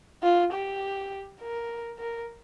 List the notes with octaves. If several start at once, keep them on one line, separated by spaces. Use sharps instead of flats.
F4
G4
A#4
A#4